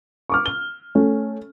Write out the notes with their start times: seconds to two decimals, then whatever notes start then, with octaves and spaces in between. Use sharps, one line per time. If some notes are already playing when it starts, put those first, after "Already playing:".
0.30 C#6 D6 F6
0.46 G7
0.95 A3 C#4